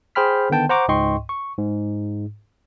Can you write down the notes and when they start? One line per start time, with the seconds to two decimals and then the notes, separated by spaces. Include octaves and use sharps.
0.15 G#4 C5 G5 B5 F6 B6
0.50 D3 D#3 B3 G5 A5
0.69 C5 F#5 A#5 C#6 D6
0.88 C#2 G#2 D#5 G5 C6 C#6
1.29 C#6
1.58 G#2